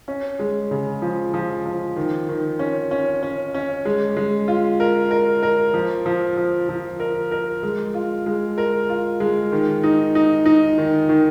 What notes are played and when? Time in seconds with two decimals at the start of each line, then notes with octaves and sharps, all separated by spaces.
0.08 C#4
0.39 G#3
0.71 C#3
1.02 F3
1.34 F3
1.66 F3
1.96 D#3
2.29 D#3
2.59 C#4
2.91 C#4
3.23 C#4
3.54 C#4
3.85 G#3
4.17 G#3
4.48 F4
4.80 A#4
5.11 A#4
5.43 A#4
5.74 F3
6.06 F3
6.37 F3
6.69 F3
7.00 A#4
7.31 A#4
7.63 G#3
7.94 F4
8.26 G#3
8.58 A#4
8.89 F4
9.20 G#3
9.52 D#3
9.83 D#4
10.15 D#4
10.46 D#4
10.78 D#3
11.09 D#3